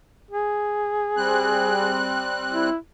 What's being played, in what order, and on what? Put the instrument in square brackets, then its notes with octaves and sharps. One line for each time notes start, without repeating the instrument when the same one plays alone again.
[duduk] G#4
[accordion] G3 C4 F#6
[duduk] E4